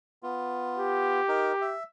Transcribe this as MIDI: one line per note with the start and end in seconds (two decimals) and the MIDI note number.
0.23 1.21 59
0.23 1.21 65
0.78 1.77 67
1.28 1.52 63
1.28 1.52 70
1.61 1.83 76